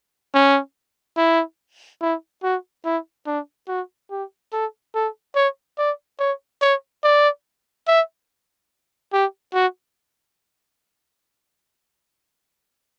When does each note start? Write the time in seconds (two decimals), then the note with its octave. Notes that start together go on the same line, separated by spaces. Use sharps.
0.34 C#4
1.17 E4
2.02 E4
2.43 F#4
2.85 E4
3.27 D4
3.68 F#4
4.11 G4
4.53 A4
4.95 A4
5.36 C#5
5.78 D5
6.19 C#5
6.62 C#5
7.04 D5
7.88 E5
9.13 G4
9.54 F#4